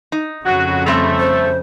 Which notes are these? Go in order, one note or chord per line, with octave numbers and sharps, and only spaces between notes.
D#4
F2 C#3 F#3 F#4
G3 A3 C4 E5
C5